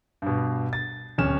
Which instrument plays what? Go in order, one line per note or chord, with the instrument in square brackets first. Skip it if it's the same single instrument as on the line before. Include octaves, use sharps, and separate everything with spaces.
[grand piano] G2 B2
A6
D1 C#4 F6 E7